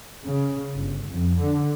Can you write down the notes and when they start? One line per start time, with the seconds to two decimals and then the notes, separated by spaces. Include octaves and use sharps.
0.24 C#3
0.77 G1
1.10 F2
1.41 D3